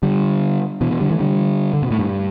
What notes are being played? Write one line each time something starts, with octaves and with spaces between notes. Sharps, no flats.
D3 G3
B2 E3
B2 E3
D3 G3
E3 A3
D3 G3
D3
B2
A2
G2